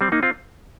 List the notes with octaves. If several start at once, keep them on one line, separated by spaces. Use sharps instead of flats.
G3 C4
A#3 D#4
C4 F4